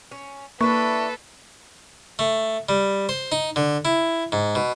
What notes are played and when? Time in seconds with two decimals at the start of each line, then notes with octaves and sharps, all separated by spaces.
0.11 C#4
0.61 A#3 D4 E4 A4 B4 C#6
2.19 A3
2.69 G3
3.09 C5
3.32 D#4
3.56 D3
3.85 E4
4.32 G#2
4.55 B2